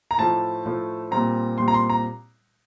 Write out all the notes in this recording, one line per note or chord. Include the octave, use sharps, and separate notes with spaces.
A#5
A2 F3 A3 A5
A2 F3 A3
A#2 G3 C4 A#5
A#2 G3 C4 C6
A#5
C6
A#5